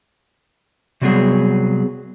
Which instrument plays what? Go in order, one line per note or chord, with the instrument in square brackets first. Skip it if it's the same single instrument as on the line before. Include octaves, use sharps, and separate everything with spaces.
[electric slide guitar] C3 F#3 G3 B3 G#4